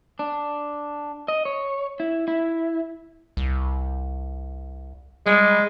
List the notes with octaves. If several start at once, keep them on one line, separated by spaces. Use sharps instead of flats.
D4
D#5
C#5
E4
E4
C2
G3 G#3